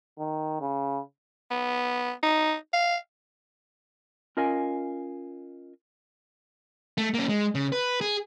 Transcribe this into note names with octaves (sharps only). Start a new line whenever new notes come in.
D#3
C#3
B3
D#4
F5
C#4 F4 A#4 D#5 F5 G#5
A3
A#3 C#4
G#3
C#3
B4
G#4